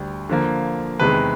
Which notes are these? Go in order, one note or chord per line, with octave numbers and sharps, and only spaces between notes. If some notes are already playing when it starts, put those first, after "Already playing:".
Already playing: D2 D3 G3
D3 F3 A#3
E2 C3 D#3 G#3 B4